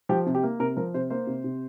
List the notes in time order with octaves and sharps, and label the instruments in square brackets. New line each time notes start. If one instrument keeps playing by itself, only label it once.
[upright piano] F3 G4
C3
G4
A#3
C3 A#4
F3 A#4
C3 C5
A#3 C5
C3
C3